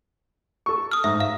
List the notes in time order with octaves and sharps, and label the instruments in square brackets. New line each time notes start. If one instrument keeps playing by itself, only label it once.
[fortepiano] A4 C#6
[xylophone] D#6 F6
[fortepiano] G#2 [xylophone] E5
[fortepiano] E5 [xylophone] F5